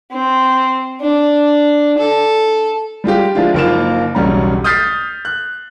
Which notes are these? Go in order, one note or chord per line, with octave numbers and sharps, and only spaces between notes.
C4
D4
A4
G3 G#3 F4 G4
F3 G#3 D4 E4 F4
F#1 F3 A#3 D#4 F4 E7
E1 B1 C#3 G3 C#4 A#5
D#6 F6 G6 A6 B6 C7
F#6